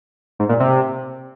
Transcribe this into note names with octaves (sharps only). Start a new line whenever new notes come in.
G#2
A#2
C3